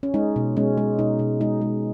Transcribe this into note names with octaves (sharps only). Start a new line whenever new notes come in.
C#4
G#3 D#4
B2
G#3 C#4
G#3
B2 D#4
B2
G#3 D#4
G#3